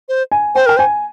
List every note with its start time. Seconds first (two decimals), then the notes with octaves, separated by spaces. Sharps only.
0.09 C5
0.32 G#5
0.55 C5 G5
0.66 A#4 G5
0.77 C5 G#5